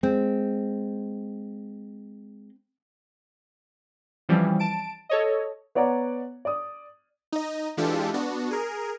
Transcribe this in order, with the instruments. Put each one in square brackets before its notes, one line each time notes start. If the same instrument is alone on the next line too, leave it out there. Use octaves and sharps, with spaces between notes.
[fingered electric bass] G#3 [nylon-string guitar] C4
[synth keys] E3 F3 G3 C4 C#4
A5 D7
A4 C#5 D#5
[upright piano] B3 C#5 D5 F#5 A#5
D5 D#6
[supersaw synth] D#4 D#5
E3 G#3 D4 F4 G4 A4
B3 D4 F#4
G#4 A#4